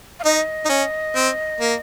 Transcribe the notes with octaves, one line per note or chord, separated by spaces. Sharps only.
F5
D#4 D#5
D#4
C#4
C4
A#3